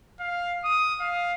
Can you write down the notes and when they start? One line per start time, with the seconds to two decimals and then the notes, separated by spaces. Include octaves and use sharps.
0.20 F5
0.64 D#6
1.00 F5